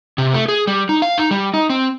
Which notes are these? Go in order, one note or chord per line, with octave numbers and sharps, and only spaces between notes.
C3
A3
G#4
G3
D#4
F5
D#4
G3
D#4
C4